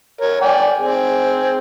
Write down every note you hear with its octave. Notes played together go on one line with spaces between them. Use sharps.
A#4 C#5
D5 G5 G#5
C4 G#4